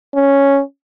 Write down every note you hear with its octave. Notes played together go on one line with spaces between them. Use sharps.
C#4